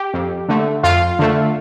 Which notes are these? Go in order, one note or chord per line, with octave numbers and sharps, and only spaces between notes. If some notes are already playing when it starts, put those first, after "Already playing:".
Already playing: G4
F2
D3 A3
F2 F4 F5
D3 A3